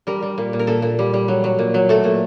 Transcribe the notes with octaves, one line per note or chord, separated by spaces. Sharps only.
G3 A#4
G3
A#2
A#2
A#4
A#2 A4
A#2
G3
G3
F#3
F#3
A#2
F#3
A3 A4
A#2